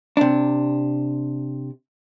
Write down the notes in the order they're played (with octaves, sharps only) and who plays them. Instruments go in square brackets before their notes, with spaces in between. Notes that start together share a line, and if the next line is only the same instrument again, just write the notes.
[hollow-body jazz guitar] C3 D4